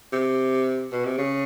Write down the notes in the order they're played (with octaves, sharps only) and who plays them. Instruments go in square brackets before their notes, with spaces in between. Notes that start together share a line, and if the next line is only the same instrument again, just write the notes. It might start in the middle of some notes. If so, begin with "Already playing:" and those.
[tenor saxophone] C3
B2
C3
C#3